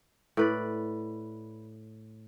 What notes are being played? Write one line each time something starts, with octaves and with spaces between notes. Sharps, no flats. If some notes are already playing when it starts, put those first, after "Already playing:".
A2 B4 D5